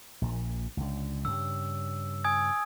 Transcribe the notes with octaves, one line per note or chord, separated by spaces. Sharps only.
A#1 A#2
C#2 D3
G2 C#3 E6
G#5 D#6 G#6